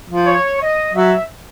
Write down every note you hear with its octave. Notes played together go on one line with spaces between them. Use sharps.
F3
C#5
D#5
F#3 E5